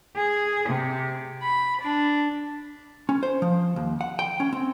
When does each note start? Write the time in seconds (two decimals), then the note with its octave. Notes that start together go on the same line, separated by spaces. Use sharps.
0.15 G#4
0.69 C3
1.43 B5
1.81 D4
3.09 C#4
3.23 C5
3.42 F3
3.76 D#2
4.01 F#5
4.19 G5
4.40 C#4
4.53 C4